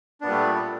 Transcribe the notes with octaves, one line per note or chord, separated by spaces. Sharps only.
A#2 G3 A3 B3 D4